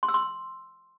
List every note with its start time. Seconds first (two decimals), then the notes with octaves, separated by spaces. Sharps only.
0.03 C6
0.09 E6
0.14 C6